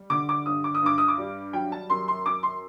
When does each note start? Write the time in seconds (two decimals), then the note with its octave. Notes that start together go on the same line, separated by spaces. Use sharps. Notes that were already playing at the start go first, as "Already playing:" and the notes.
Already playing: G3
0.10 D3 D6
0.29 D6
0.46 G2 D#6
0.64 D6
0.75 D#6
0.83 G2 D6
0.98 D#6
1.08 D6
1.18 G3
1.53 F#3 G5
1.72 A5
1.90 F#2 C6
2.08 C6
2.26 F#2 D6
2.43 C6